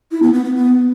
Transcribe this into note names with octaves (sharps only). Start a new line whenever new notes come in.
E4
B3
B3
B3
B3